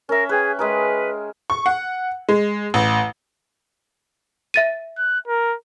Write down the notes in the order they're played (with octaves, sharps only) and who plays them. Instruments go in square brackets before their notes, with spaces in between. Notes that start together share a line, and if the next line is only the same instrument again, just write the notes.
[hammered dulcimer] C#4 E5 [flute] A#4
[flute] G#4 [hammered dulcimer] B4 G5
[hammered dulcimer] G#3 G#4 A#4 [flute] B4
[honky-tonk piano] C#6
F#5
G#3
A1
[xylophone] E5 A6 D#7
[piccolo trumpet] F#6
A#4